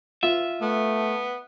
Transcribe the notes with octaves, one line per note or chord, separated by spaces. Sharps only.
F4 E5
A3 B3